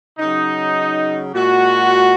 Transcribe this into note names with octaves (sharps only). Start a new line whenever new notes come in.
C#3 F#3 D#4
A#2 G#3 F#4